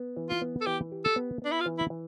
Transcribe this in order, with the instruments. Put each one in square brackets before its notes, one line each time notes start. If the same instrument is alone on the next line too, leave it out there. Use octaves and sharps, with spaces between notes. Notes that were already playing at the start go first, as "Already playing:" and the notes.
Already playing: [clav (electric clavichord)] B3
E3
[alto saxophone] F4
[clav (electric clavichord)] B3
[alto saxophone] A4
[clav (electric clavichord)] E3 [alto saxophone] G4
[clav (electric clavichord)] G4
[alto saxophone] A4
[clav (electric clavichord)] B3
[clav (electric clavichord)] B3 [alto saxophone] D4
[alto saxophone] E4
F4
[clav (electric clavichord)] E3
[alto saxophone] E4
[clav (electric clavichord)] E3